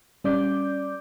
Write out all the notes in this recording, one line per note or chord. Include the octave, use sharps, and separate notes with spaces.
G3 C#4 D5 D6 G6